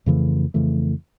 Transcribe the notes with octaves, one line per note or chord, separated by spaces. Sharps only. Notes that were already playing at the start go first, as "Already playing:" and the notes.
F2 C#3 E3 A3
F2 C#3 E3 A3